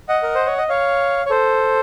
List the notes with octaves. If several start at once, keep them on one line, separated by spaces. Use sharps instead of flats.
D#5 F#5
A#4
C5
C#5
D#5
C#5 F5
C#5
A4 C5